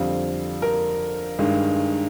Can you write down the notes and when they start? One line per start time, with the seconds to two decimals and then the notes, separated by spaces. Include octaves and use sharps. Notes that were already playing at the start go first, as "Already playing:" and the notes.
Already playing: F2 D3 G3 C4 F5
0.62 A#4
1.39 G2 D#3 G#3